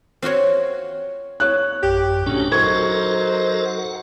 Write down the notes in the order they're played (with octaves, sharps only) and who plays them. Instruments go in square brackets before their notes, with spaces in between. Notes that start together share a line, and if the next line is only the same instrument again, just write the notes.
[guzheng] C4 F4 F#4 C#5
[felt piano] C#5 F#6
[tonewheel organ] A1 F#2 [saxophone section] G4
[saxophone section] D2 C#4 [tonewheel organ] A#2 D4 G4
[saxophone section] F#3 D#4 C5 [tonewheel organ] A4 A#4 [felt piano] C#6 G#6
[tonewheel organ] F#5